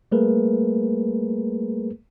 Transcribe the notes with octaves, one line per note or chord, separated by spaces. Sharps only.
G3 A3 A#3 G#4 A#4 B4